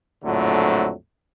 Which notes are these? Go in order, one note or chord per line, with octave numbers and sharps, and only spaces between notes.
A#1 F2 A2 D3 F#3 A3